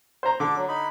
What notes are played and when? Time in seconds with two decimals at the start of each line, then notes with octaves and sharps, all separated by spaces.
0.23 C5 A#5
0.40 D3 A4 D6
0.56 F#3
0.68 D#4 B5